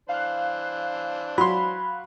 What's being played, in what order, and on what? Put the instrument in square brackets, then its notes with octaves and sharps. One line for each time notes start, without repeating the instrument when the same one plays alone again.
[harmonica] E3 D4 C5 [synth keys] F5 F#6
[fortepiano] F#3 C6 [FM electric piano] B5